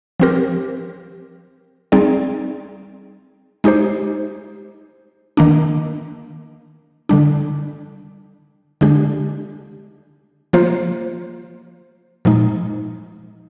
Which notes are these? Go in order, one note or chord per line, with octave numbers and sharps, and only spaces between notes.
F3 C4 G4 A#4
G3 C4 D#4 G#4 D5
G#3 D#4 G4 C5
D#3 A#3 D4
D3 G3 D4
D3 G#3 D4 G4
F3 A#3 F4 C5
A#2 F3 G#3 D#4